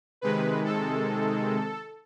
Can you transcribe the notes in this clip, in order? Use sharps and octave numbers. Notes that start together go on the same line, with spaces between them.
C3 D#3 G#3 B4
A4